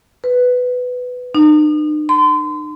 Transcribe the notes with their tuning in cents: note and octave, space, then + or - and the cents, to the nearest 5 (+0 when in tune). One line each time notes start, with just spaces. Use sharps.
B4 +10
D#4 -45
C6 -35